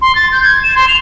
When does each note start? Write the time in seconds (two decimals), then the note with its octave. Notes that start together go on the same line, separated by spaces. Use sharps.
0.02 C6
0.15 A6
0.32 G6
0.44 G#6
0.63 E7
0.75 C6
0.88 F7